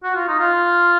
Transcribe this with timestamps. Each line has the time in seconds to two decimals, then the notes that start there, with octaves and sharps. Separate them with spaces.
0.04 F#4
0.15 F4
0.28 D#4
0.39 F4